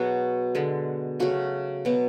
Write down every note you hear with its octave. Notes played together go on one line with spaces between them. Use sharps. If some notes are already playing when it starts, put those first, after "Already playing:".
Already playing: B2 F#3 B3 F#4 G#4
D3 G#3 B3
C#3 F#3 A3 F#4
B2 F#3 B3